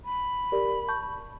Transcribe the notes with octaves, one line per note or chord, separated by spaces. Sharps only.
B5
G4 A#4 D5
A5 C#6 G6